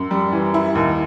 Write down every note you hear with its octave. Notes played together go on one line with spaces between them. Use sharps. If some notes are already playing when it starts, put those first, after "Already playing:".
Already playing: F#2
G3
E3
E4
D#2